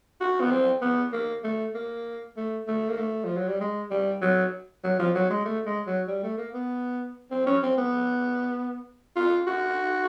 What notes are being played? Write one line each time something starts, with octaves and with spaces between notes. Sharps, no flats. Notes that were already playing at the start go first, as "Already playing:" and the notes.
F#4
B3
C4
B3
A#3
A3
A#3
A3
A3
A#3
A3
F3
F#3
G3
G#3
G3
F#3
F#3
F3
F#3
G#3
A3
G#3
F#3
G3
A3
A#3
B3
C4
C#4
C4
B3
F4
F#4